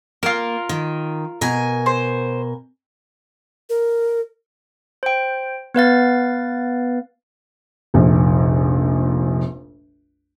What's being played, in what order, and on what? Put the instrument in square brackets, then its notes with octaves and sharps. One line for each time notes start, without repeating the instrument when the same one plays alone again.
[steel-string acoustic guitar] A#3 [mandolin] F4 A#4
[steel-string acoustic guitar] D#3
B2 A#4 G#5
[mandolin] C5
[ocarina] A#4
[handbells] C5 G5
B3 B4 F5 A6
[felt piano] F1 A#1 F2